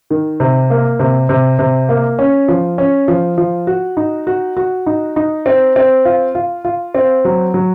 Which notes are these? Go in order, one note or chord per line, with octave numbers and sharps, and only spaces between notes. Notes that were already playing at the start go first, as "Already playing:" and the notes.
D#3
C3
A#3
C3
C3
C3
A#3
C#4
F3
C#4
F3
F3
F#4
D#4
F#4
F#4
D#4
D#4
C4
C4
F4
F4
F4
C4
F#3
F#3